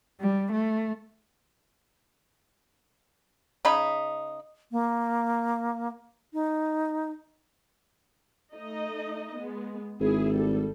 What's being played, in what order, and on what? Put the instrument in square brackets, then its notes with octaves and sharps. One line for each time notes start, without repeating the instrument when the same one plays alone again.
[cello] G3
A3
[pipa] C#3 D#4 B5
[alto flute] A#3
D#4
[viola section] A3 D#4 D#5
G#3 B3
[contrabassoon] G#1 [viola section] E4 G#4
[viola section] G3 A4